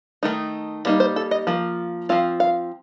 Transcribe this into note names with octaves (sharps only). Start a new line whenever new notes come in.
D#3 A3 D#4
G3 A#3 D#4
C5
A4
D#5
F3 A#3
F3 C4 F4 F5
F5